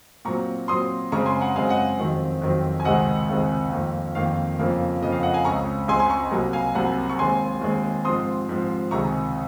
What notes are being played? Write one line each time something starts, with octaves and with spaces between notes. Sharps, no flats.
A#2 F#3 C4 A#5 C#6
A#2 F#3 C4 C6 D#6
F#2 C#3 G#3 C4 A#5 C#6
G#5 C6
F#5 A#5
F#2 C#3 G#3 C4 F5 G#5
D#5 F#5
F2 D#3 F#3 C4
F2 D#3 F#3 C4
G#5
C#2 C3 D#3 G#3 C4 D#5 F#5
C#2 C3 D#3 G#3 C4
F2 D#3 A#3
F2 D#3 A#3 F5
F2 C#3 F3 A#3
F2 C#3 F3 A#3 D#5
F5
D#5 F#5
F5 G#5
C#2 C#3 G#3 C4 A#5 C#6
C#2 C#3 G#3 C4 G#5 C6
G#5 C6
A#5 C#6
D#5
C2 C3 F#3 A#3 D#5
F5 G#5
C2 C3 F#3 A#3 F#5 A#5
C#6
D#2 D#3 G#3 C4 G#5 C6
D#2 D#3 G#3 C4
G#2 F3 C4 C6 D#6
G#2 F3 C4
C#2 C3 D#3 G#3 A#5 C#6